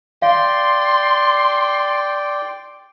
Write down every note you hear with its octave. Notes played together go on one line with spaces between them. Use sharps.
D5 F5 G5 C6